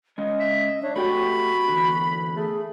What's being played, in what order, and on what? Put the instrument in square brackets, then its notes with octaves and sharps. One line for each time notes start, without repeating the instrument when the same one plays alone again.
[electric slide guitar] G#3 C#4 [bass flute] D#5
[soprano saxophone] E5
[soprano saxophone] D4 [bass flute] C#5
[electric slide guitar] A3 G4 G5 [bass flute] F#4 [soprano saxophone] B5
[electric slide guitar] E2 D3
[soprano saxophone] A3 [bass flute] G#4